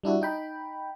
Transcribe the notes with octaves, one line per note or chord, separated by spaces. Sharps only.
G3 D4 E4 F#4
D#4 G5 B5